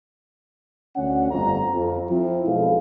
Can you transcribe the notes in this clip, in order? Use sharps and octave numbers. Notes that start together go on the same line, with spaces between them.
D2 C#4 F#5
G1 F2 A#5
F2
F3 C4 E4
B1 B2 G#3 A4 F5